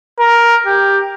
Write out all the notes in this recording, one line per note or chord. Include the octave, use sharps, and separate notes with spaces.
A#4
G4